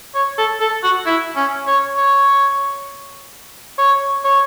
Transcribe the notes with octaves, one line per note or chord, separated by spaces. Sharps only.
C#5
A4
A4
F#4
E4
C#4
C#5
C#5
C#5
C#5